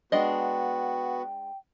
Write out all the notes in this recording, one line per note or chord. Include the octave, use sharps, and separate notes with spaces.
G#3 B3 D4 F#4 D#5 G5